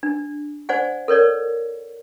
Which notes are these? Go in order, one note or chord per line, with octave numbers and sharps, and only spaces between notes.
D4
C5 D5 F#5 G#5
A4 A#4 C#5 D5